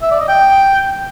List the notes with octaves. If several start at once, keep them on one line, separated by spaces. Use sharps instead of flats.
E5
D5
D#5
G5